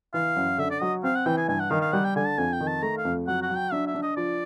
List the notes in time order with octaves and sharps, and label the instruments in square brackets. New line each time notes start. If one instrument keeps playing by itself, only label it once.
[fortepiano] E3 [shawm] F5
[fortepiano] F#2
[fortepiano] D3 [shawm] E5
[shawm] D5
[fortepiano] F#3 [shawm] D#5
[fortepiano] C4 [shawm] F5
[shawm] F#5
[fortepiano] E3 [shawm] G5
[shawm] G#5
[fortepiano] G2 [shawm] G#5
[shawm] F#5
[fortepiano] D#3 [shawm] F5
[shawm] F5
[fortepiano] G3 [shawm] F#5
[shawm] G5
[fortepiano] D3 [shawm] G#5
[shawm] A5
[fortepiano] F2 [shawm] G#5
[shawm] G5
[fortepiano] D#3
[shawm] A5
[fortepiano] A3 [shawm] A#5
[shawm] F5
[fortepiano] F2
[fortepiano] F#3 [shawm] F#5
[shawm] F#5
[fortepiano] F#3
[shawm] G5
[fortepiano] D4 [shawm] E5
[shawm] E5
[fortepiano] D4
[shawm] D#5
[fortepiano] F3 [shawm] D5